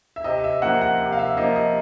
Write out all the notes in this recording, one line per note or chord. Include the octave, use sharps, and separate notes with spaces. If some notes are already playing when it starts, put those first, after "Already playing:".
E5
C3 D#5
E5
F3 A#3 F#5
F#5
C3
F5
E5
F3 A#3 D#5
D#5